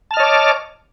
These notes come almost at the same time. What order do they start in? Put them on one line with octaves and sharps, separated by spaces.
A5 F6 D#5 C#5 D6